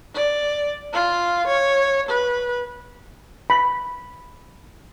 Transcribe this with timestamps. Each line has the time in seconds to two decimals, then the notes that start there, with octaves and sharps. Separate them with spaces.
0.14 D5
0.93 F4
1.47 C#5
2.09 B4
3.50 B5